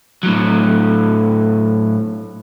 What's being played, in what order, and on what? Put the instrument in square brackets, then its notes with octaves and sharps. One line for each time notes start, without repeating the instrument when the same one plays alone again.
[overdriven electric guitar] A2 F#3